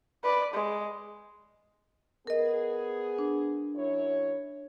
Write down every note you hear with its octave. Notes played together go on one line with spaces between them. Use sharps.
B4 D5
G#3
B3 G#4 A#4 D#5
D4
F#2 E4 C#5